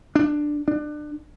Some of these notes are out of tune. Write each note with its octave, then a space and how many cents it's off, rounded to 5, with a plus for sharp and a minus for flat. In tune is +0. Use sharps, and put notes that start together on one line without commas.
D4 +10
D4 +30